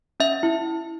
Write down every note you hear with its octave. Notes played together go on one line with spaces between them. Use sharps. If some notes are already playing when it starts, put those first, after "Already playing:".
C#4 E5
E4